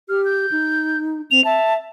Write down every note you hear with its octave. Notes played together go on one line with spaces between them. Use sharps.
G4 F6
G6
D#4
C4 F7
E5 A5